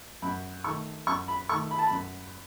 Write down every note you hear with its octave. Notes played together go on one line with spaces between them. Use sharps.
F#2 B5
D#3 A3 C#6
F#2 C#6
B5
D#3 A3 C#6
B5
A5
F#2 B5